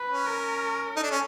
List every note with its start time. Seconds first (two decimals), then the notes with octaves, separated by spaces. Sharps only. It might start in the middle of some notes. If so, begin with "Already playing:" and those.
Already playing: B4
0.09 C#4
0.26 A#4
0.96 D#4 A4
1.03 D4
1.11 C#4